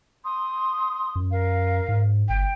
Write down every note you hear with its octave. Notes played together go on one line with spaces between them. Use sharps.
C6 D#6
F#2
A#4 F5
G#2
G1 G5